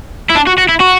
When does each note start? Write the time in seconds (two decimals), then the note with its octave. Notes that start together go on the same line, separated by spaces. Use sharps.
0.30 E4
0.36 D4
0.47 F#4
0.58 F#4
0.69 E4
0.80 F#4